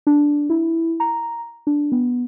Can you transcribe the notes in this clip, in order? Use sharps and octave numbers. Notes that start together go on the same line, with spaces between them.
D4
E4
A#5
D4
B3